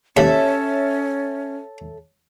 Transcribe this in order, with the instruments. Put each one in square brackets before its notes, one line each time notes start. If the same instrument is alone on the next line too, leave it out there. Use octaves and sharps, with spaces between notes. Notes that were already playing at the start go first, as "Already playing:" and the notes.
[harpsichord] D#2 E3 [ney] C#4 [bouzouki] A4 E5 [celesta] C#5